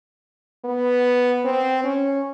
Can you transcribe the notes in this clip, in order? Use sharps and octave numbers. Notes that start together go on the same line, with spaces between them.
B3
C4
C#4